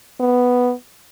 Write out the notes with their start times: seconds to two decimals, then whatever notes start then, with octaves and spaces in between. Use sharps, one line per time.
0.20 B3